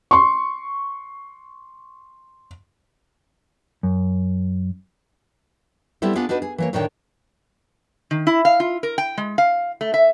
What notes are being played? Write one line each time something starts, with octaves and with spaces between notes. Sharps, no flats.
C6 C#6
F#2
G3 B3 C4 E4 A4
B3 D4 F4 G#4
D4 D#4 F#4 B4
G#4
E3 A#3 C#5
D2 A2 D#3 D4 C#5 G5
D#3
E4
F5
F4
A#4
G5
G#3
F5
A3
E5